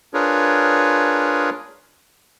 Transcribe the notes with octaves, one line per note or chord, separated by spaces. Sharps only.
D4 F4 G#4 A#4 B4 C#5